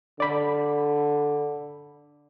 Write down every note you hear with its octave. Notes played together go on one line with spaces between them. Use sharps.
D3 D5 B5